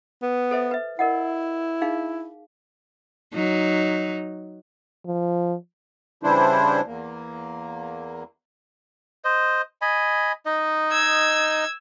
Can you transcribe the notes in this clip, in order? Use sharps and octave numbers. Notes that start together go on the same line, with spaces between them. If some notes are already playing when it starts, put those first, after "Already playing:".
B3
A4 C5 E5
B4 E5
E4 A#4 D#5 F#5
D#4 G#4 F5
F#3 D#4
F3
C#3 E3 G3 D4 E4 C5
E2 A#3
C5 D#5
D#5 G#5 B5
D#4 D#5
E6 G#6